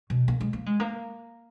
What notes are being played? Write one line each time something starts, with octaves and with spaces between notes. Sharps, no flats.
B2
A#3
G#3
A#3
G#3
A#3